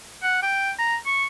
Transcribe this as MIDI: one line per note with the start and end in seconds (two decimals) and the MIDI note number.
0.23 0.41 78
0.43 0.71 79
0.79 0.96 82
1.06 1.26 85